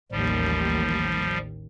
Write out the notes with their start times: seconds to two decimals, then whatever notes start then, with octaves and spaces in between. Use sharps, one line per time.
0.12 A1 D#2 F3 G3